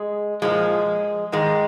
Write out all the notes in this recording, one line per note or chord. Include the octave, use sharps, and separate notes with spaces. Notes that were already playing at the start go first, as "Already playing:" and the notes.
Already playing: G#3
A#2 F3 G#3
G#2 D#3 G#3